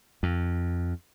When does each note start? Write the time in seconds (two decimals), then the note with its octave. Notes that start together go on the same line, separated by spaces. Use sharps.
0.23 F2